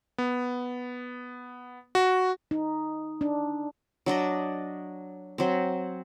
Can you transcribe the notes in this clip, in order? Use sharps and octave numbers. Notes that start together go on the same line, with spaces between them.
B3
F#4
D#4
D4
F#3 D4 D5 D#5
F#3 C4